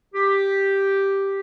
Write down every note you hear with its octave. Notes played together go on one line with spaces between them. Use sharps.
G4